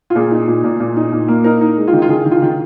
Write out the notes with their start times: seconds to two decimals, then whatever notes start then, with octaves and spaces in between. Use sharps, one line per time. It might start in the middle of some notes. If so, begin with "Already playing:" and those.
0.10 F4
0.15 A#2 G#4
0.31 D#4
0.48 A#2
0.64 A#2
0.80 A#2
0.96 D#4
1.12 A#2
1.28 A#3
1.44 D#4 A#4
1.61 D#4
1.77 G#3
1.88 F4
1.93 D#3
2.02 F4
2.09 D#3 G#4
2.25 D#3
2.32 F4
2.42 D#3